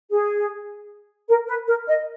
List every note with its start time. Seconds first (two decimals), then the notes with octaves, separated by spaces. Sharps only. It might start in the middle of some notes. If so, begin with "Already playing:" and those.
0.10 G#4
1.28 A#4
1.48 B4
1.68 A#4
1.87 D#5